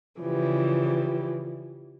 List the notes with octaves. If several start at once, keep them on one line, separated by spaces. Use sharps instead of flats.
C#3 E3 F3 G3